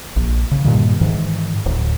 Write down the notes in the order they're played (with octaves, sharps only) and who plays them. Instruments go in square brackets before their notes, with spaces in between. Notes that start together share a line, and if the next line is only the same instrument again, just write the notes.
[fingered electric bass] A#1
C#3
G2 A#2 D#3 F3
G#2 D#3 E3
D1